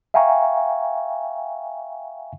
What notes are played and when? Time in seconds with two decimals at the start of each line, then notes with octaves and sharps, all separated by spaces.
0.14 E5 F5 G5 G#5 A#5 C#6